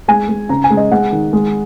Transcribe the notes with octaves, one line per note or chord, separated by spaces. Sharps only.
G#3 G#5
G#3
C#3 A#5
G#5
G#3
D#5
G#3 F#5
D#3
G#3